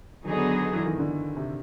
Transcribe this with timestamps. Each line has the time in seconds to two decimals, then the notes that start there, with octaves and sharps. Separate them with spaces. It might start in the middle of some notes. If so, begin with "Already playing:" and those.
0.24 D3 D#3 F#3 B3 D#4 G#4
0.73 E3
0.85 D#3
0.99 D3
1.37 C3